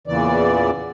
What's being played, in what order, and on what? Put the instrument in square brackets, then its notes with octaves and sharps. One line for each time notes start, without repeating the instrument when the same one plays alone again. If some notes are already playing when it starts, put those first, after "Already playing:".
[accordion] E2 A#2 C#3 E3 D5